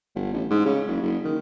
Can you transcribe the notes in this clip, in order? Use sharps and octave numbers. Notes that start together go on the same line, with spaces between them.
G1
A1
G#2
C#3
F#1
F#1
D#3